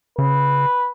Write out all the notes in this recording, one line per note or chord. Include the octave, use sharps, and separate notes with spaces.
C#3 B4